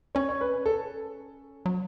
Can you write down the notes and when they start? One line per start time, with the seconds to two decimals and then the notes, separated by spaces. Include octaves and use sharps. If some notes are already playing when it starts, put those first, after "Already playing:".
0.15 C#4 C#5
0.29 C#5
0.41 B4
0.66 A4
1.66 F#3